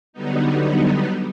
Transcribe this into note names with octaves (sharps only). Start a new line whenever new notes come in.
D3 F#3 G3 B3 D#4